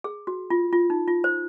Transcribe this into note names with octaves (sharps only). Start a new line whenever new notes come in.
G#4
F#4
F4
F4
D#4
F4
C5